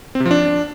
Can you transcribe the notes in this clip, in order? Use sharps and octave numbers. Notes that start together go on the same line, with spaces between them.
C4
C3
F3
D4